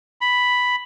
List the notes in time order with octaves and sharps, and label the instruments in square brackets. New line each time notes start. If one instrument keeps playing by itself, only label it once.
[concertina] B5